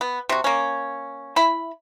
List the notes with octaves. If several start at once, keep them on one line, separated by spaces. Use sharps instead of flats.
B3
C3 F#4
A#3 C#4
E4 B5